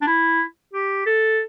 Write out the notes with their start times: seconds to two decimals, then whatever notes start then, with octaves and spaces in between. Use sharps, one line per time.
0.02 D4
0.07 E4
0.74 G4
1.06 A4